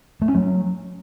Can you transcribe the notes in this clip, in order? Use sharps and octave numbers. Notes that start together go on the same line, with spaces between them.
A3
C#4
F#3